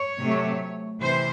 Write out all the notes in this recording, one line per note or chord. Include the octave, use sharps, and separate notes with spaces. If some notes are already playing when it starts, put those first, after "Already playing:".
Already playing: C#5
C3 F#3 A3
C3 E3 C5